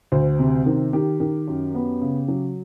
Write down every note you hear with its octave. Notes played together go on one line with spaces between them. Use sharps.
D2 C5
C3
D#3
D#3 G4
D#3
F#2
B3
C#3
F#3